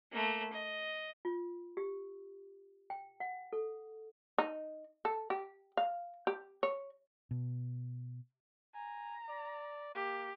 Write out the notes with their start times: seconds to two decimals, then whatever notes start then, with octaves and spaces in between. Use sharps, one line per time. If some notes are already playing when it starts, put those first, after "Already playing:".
0.12 A3 A#3
0.53 D#5
1.25 F4
1.77 G4
2.90 G5
3.20 F#5
3.53 A4
4.38 D#4
5.05 A4
5.30 G4
5.77 F5
6.27 G4
6.63 C#5
7.31 B2
8.75 G#5 A#5
9.29 D5
9.95 A#3 G4